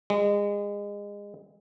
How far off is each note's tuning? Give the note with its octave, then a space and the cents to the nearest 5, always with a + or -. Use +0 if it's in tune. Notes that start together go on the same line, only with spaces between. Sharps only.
G#3 -30